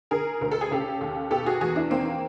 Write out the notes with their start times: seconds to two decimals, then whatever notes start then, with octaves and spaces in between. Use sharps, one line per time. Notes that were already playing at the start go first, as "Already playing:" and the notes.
0.11 D3 G#4 A#4
0.41 D2 A#4
0.51 A4
0.61 G#4
0.71 C#3 G4 A4
1.01 D#2
1.31 B2 G4 A4
1.46 F#4 G#4
1.61 E2 F#4 G#4
1.76 D4 E4
1.90 D#3 A#3 C4